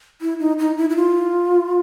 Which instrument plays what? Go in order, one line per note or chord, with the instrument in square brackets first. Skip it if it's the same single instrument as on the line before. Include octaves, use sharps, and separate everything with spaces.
[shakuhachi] E4
D#4
D#4
E4
E4
F4